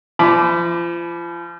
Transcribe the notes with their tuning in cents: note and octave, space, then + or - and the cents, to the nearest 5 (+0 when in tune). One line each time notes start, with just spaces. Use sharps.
F3 -35 B5 +0 D6 +0